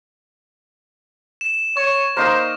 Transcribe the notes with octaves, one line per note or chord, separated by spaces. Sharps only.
E7
C#5 C#6
A#3 D#4 A#4 C5